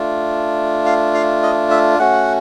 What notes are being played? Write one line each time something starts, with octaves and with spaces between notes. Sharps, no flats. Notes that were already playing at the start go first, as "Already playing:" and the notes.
Already playing: A3 D4 F4
F5
F5
D#5
E5
A3 C#4 F#4 F#5